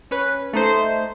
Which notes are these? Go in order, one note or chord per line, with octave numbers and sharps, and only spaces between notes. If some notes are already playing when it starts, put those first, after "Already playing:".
C#4 B4
A3 D#4 C5